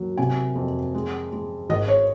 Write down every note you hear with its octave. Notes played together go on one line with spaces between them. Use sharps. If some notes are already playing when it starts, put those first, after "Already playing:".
Already playing: D#2 F#3
C3 G#5
F2
G#3
G#3
G#1 D#5
C#5